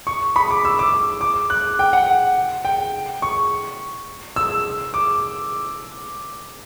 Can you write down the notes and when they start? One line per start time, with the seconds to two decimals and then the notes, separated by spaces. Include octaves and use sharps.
0.07 C#6
0.36 B5
0.51 D6
0.65 E6
0.79 D6
1.21 D6
1.50 F#6
1.79 G5
1.93 F#5
2.65 G5
3.22 C#6
4.36 E6
4.94 D6